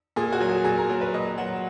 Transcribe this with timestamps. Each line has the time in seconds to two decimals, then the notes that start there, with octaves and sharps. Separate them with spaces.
0.16 A#2 G#4
0.33 F#4
0.40 F#3
0.49 G#4
0.64 A#2 G#4
0.77 A#4
0.90 F#3 A#4
1.01 B4
1.14 A#2 D#5
1.38 F#3 F#5